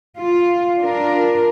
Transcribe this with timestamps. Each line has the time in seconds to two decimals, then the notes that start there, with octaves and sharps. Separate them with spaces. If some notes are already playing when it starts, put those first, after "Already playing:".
0.17 F4
0.79 D4 F4 A#4